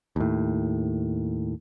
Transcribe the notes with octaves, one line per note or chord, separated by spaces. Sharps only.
D#2 A2